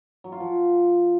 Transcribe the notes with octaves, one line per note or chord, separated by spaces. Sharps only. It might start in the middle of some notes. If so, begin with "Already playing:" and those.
F#3
F4
F3